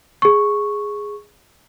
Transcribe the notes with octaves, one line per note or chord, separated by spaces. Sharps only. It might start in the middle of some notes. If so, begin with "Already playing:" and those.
G#4 C#6